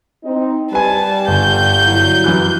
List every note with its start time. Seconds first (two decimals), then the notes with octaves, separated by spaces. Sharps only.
0.24 C4 D#4
0.73 G3 B4 G#5 A5
1.28 G1 G6
1.83 F#3 E4
2.24 F#2 E3 F#6